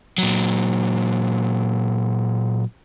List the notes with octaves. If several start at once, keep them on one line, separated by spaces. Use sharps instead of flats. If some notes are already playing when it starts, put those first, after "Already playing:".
A#2 F#3